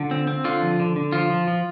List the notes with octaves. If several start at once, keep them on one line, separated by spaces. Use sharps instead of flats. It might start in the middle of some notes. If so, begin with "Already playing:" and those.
Already playing: D3 F4
C4
C4
D3 F4
F3
D3
D3
F3 F4
F3
F3